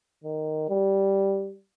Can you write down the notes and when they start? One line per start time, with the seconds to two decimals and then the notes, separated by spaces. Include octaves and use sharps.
0.24 D#3
0.69 G3